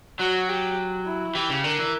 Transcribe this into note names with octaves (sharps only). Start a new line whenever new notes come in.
F#3 F#4
G4
E4
E3 G4
C#3
D3 A#4
E3